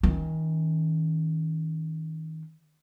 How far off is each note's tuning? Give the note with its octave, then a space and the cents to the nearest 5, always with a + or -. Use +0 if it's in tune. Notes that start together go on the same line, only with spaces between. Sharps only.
D#3 +35 C#4 +0